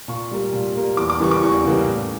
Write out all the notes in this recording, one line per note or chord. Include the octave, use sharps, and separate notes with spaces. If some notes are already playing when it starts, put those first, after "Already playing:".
A#2 C#6
G3 A#3
A#2
G3 A#3
E2 D6
D6
C#3 E3 G3 A#3 C#6
D6
E2 C#6
C#3 E3 G3 A#3
A2